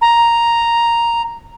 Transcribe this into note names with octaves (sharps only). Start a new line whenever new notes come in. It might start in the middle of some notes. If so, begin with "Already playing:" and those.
A#5